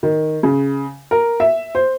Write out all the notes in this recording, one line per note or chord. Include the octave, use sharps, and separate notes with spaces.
D#3
C#3
A#4
E5
C5